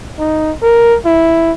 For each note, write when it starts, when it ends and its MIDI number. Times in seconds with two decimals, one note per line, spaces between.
0.19 0.52 63
0.62 0.97 70
1.05 1.52 64